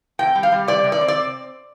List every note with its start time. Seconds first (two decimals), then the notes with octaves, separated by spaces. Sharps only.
0.19 C3 G5
0.35 G3
0.43 F5
0.52 G3
0.68 C3 D5
0.84 C3
0.92 D5
1.01 C4
1.08 D5